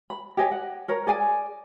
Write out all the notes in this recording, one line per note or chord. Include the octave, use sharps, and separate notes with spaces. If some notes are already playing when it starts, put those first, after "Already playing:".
B5
G4 C#5 D#5 G#5
F#5
A#4 C#5 A#5
G#4 D5 G#5